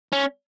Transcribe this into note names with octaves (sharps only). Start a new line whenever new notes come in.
C#4